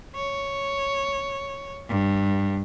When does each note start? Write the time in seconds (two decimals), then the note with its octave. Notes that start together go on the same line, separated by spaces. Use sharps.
0.15 C#5
1.89 G2